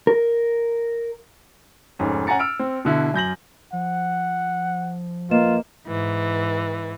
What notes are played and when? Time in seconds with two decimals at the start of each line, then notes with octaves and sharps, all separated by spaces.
0.07 A#4
1.99 F1 G#2 C#4
2.27 C#4 F#5 G#5 A#5 A6 C#7
2.39 E6 F6 D7
2.59 C4
2.85 B2 D3 E4
3.14 F#2 G6 A#6 F#7
3.73 F3 F#5
5.31 A#3 F4 B4 D#5 E7
5.87 G#2 E3